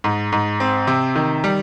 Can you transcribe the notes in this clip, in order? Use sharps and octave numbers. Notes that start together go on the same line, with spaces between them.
G#2
G#2
C4
C3
D#3
G3